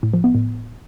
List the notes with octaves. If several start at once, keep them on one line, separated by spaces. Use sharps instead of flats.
A2
F3
B3
A2